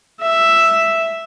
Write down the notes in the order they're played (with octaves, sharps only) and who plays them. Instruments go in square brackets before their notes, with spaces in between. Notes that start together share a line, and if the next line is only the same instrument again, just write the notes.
[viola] E5